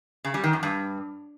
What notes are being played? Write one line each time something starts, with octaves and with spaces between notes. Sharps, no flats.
C#3
G3
D#3
F#2
G2